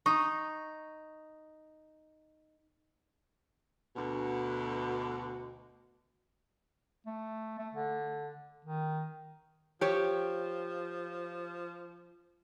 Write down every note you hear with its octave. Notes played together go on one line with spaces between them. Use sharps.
D#4 C#6
D2 B2
A3
A3
D3
D#3
F3 G4 C#5